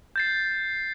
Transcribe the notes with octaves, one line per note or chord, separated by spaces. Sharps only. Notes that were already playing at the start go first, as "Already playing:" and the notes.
G6 A6 C7